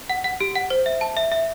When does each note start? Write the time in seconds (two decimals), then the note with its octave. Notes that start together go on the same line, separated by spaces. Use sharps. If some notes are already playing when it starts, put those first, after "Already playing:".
0.10 F#5
0.24 F#5
0.41 G4
0.55 F#5
0.70 C5
0.86 E5
1.01 A5
1.17 E5
1.32 E5